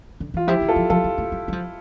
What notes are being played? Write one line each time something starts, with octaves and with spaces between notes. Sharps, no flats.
D3
E3 F4
F3 E4 G4
E3
F4 A4
F3
F3 F4 A4
G3
A3
G3
G3
F3